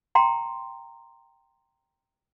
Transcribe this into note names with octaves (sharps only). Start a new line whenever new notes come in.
G5 A#5 C6